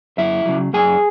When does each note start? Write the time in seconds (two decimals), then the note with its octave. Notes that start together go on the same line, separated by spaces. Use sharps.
0.18 F#2 E4 E5
0.46 C#3 F#3
0.73 F#2 G#4 G#5